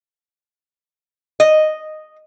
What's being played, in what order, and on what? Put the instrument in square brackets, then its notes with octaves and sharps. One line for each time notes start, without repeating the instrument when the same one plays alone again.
[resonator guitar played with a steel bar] D#5